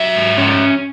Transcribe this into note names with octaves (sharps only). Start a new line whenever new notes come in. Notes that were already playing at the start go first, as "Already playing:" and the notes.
Already playing: F#3 E5
G#2
C#4